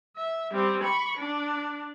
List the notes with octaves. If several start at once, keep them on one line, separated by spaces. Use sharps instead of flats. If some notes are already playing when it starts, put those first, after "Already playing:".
E5
G3 C4
B5 C#6
D4